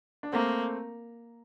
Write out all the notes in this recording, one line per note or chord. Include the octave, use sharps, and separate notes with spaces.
D4
A3 A#3 C4